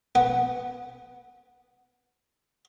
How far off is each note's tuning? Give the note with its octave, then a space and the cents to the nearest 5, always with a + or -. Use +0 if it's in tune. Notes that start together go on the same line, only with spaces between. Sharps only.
B3 +0 F#5 +0